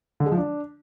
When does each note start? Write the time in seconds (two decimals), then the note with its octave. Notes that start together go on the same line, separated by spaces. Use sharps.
0.20 D3
0.26 G#3
0.32 F3
0.38 D4